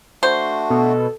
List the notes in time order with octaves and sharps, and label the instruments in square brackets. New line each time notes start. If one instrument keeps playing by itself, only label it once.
[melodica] A3 D4 F#4 [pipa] C5
[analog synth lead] B2 [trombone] A4